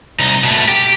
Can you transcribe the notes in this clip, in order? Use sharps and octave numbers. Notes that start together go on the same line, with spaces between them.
C2 D#4
B2 A3
G4